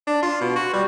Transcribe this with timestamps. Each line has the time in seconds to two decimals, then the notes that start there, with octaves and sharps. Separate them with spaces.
0.07 D4
0.23 F4
0.41 B2
0.56 F#4
0.73 G3